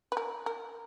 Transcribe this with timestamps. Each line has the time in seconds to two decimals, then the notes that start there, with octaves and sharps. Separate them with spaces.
0.12 B4
0.17 A#4
0.46 A#4